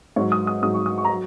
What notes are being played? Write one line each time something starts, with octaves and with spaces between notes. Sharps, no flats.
G#2 F#3 C#5
D#6
D#6
G#2 F#3 D#6
C#6
D#6
C#6
A#5
F#3